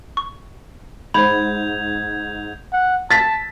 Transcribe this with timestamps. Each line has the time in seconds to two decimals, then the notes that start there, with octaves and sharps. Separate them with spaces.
0.17 C#6
1.14 G#2 C5 B5 G6 G#6 F7
2.73 F#5
3.11 A5 A6 B6